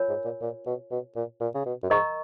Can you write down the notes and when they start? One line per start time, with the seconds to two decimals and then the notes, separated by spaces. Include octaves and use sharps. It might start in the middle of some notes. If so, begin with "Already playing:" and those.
Already playing: F4 A#4 C#5 G#5
0.09 G#2
0.25 A#2
0.41 A#2
0.66 B2
0.91 B2
1.16 A#2
1.40 A#2
1.54 C#3
1.66 B2
1.83 F#2
1.90 G#2 A#4 D#5 A#5 C#6